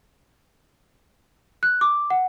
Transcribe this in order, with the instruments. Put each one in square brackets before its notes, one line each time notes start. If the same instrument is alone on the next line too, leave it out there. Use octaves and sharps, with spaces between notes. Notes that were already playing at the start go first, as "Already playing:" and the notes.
[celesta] F#6
D6
F#5